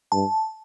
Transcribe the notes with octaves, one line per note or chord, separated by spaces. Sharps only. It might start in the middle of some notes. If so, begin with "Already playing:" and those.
G2 A5